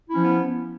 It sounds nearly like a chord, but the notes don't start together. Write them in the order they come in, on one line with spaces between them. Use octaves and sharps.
E4 C#4 F3 B3